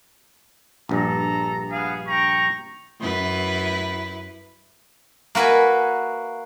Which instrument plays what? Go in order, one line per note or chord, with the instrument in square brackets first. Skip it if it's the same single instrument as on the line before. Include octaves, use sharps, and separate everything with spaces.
[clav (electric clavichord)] A#1 G2 [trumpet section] A4 A#5
[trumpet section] B3 G#4 F5
G5 A#5 C#6
[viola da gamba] F#2 E4 B4
[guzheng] A#3 F#4 B4 E5 G#5